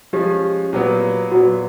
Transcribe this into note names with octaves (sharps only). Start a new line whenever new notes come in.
F3 G#3 C#4 G4
A#2 F#3 B3
A#2 F#3 B3 F#4